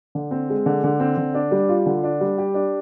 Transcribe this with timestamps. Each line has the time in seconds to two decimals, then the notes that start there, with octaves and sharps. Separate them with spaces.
0.15 D3
0.31 C4
0.49 G#3
0.66 D3
0.84 D3
1.00 C4
1.17 D3
1.34 D4
1.51 G3
1.69 F4
1.86 D3
2.03 D4
2.21 G3
2.38 G4
2.54 D4